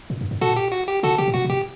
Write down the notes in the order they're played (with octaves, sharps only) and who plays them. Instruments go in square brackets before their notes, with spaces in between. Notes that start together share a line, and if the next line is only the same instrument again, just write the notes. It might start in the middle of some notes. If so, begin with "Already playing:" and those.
[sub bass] A2
F#2
G2
[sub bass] A#2 [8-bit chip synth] F#4 A4
[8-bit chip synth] G4
F#4
G4
[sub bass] C3 [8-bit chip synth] F#4 A4
[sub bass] C3 [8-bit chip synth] G4
[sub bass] A2
[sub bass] A#2 [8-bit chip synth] F#4
[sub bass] A#2
[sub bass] A2 [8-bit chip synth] G4